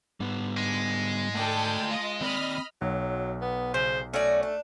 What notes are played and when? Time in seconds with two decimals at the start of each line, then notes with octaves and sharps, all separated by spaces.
0.20 G#2 G3 B3
0.57 G#3
1.35 A3 A4 D5 G5 A5
1.87 F4 D#5
2.21 D#2 C4 D5 D#5 B5 F6
2.81 B1 F#3
3.41 B3
3.74 C#3 C5
4.14 A3 C#4 F#4 D5
4.43 D4